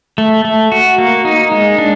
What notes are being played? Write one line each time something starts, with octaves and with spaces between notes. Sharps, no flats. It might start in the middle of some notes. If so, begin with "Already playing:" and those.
A3
A3
F#4
A#3
D#4
G#3
D4